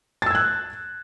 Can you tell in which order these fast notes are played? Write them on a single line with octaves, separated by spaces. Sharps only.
A6 E6 G#6 F#6